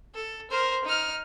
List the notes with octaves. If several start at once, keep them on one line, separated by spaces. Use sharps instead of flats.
A4
A#4 C5
D#4 F6